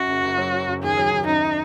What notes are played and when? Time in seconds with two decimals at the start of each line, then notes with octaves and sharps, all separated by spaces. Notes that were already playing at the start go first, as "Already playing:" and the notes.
Already playing: F#2 F#4
0.08 F#1
0.23 F#1
0.37 F#3
0.53 C#4
0.68 F#1
0.83 D#2 G#4
0.97 F#3
1.12 D#2
1.27 F#2 D#4